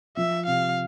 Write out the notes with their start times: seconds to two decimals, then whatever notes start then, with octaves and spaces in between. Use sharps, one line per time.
0.17 F3 E5
0.46 C3 F5